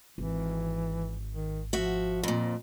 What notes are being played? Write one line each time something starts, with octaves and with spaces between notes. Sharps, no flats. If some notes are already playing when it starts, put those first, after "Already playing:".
G#1 E3
D#3
F3 F#4 E5
F2 A#2